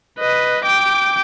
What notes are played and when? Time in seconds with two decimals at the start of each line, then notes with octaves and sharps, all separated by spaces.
0.19 B4 D#5
0.64 G5 D6